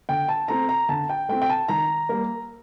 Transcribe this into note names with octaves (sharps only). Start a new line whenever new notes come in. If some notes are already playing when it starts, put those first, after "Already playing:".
D3 G5
A5
A3 C4 A#5
A#5
D3 A5
G5
A3 C4 G5
G5
A5
D#3 A#5
G3 A#3